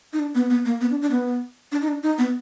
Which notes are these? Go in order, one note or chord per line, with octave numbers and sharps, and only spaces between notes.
D#4
D4
B3
B3
A#3
B3
D4
D4
B3
D4
D#4
D4
D#4
B3